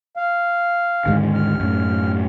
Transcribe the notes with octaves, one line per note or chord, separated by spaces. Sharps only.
F5
D#2 G#2 D3
F6
F#2 A2